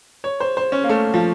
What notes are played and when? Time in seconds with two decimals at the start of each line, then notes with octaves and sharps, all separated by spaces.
0.24 C#5
0.40 C5
0.57 C5
0.72 C#4
0.84 A#3
0.89 A3
1.14 F3